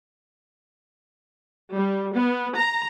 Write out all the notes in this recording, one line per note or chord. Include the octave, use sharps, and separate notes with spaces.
G3
B3
A#5